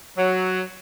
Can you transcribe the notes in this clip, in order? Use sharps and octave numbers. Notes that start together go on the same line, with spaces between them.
F#3